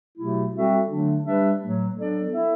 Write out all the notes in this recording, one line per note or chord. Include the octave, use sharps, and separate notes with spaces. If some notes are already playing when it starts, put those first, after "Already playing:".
B2 F#3 A3 E4 G4
G3 C4 F#4 A4 E5
D3 F#3 A3 D4
G3 D4 G4 B4 E5
A2 F#3 A3
F#3 B3 D4 A4 D5
B3 E4 A4 E5